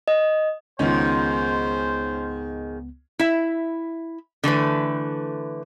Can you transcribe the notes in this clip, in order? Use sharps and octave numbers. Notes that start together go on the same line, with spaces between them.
D#5
C#2 G#2 D#3 B3 C#4 F4 C5
E4 E5
D3 E3 A3 B4